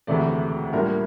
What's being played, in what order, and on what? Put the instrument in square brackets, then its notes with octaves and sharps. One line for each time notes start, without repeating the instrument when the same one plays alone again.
[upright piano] E1 D2 C3 E3 A3 D5
A2 G3 A#3 D4 F4 A#4
A#4